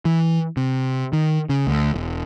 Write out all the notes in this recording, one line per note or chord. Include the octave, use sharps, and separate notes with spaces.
E3
C3
D#3
C#3
D2
E1